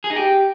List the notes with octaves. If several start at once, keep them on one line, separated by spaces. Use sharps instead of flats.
G#4
D#4
G4